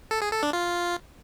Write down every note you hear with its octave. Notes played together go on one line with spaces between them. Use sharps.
A4
G#4
A4
D4
F4